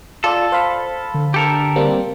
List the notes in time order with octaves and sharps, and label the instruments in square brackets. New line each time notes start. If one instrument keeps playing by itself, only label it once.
[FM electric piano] F4 D5 [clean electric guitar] A4
[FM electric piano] C5 F5 B5
[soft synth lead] D3
[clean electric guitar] G4 A4 A#4
[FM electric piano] G3 A#3 C4